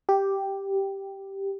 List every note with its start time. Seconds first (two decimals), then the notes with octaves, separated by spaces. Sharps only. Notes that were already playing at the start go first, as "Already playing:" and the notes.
0.09 G4